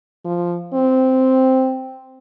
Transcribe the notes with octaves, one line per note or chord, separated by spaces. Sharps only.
F3
C4